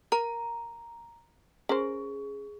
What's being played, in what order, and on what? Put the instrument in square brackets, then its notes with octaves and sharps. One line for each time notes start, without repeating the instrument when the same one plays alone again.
[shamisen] A#4 [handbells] A#5
[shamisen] C#4 A#4 C5 [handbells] G#4